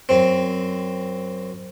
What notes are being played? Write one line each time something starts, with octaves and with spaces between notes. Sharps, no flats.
F#2 C4